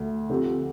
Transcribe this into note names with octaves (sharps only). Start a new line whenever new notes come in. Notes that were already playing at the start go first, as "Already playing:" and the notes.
Already playing: D2 D3 A3
D3 F3 C4 G4